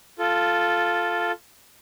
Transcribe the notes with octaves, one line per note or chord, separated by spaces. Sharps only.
F4 A4